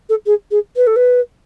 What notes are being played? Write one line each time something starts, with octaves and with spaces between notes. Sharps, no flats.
A4
G#4
G#4
B4
A4
B4